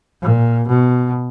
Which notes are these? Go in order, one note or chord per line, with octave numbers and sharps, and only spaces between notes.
A#2
B2